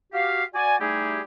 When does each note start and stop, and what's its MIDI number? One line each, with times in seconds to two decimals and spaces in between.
0.13 0.43 66
0.13 0.43 67
0.13 0.43 77
0.54 0.76 66
0.54 0.76 74
0.54 0.76 80
0.80 1.21 55
0.80 1.21 57
0.80 1.21 63
0.80 1.21 64
0.80 1.21 67
0.80 1.21 68